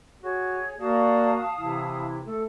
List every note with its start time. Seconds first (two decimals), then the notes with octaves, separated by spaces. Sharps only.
0.23 F#4 G#4 C#5
0.80 A#3 F#4 D5 F5 A5 D#6
1.58 C3 E3 E4
2.26 A3 A4